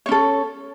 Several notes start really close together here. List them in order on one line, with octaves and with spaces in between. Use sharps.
C#5 C#4 A4